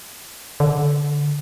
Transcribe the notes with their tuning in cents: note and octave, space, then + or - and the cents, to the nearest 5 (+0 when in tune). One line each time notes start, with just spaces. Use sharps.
D3 -10